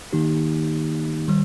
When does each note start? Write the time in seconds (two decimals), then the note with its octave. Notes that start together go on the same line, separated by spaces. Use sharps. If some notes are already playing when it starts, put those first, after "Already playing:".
0.13 D#3 A#3 D#4 G4
1.28 D#3 G3